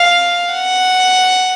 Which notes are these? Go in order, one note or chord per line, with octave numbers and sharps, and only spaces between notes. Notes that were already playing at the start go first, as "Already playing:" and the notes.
Already playing: F5
F#5